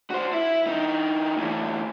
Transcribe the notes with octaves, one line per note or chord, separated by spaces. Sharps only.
F#4 C5
E4
E3 D#4
D2 E3